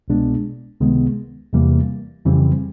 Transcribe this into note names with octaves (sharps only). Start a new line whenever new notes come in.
C2 B2 G#3 B3 D4
C#2 C3 D#3 G#3 B3
E2 C3 E3 G3 A#3
F2 C#3 E3 G3 C4